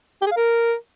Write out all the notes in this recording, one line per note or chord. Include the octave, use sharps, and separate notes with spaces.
G4
G#4
F5
A#4